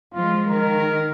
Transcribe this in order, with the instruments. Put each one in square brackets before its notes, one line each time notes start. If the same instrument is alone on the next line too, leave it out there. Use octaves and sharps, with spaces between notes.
[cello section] F3 G#3 [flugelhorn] F4
[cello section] D#3 [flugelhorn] A#4